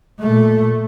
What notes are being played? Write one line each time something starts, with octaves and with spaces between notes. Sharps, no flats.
A#2 A3